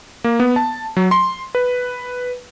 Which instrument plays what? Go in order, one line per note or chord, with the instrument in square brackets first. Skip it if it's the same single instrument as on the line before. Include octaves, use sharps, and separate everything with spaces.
[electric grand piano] A#3
B3
A5
F#3
C6
B4